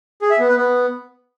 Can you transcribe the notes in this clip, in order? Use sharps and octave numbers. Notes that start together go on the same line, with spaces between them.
G#4
E5
B3
B4
B3